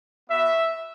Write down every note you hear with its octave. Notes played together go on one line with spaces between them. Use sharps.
B3 F#4 E5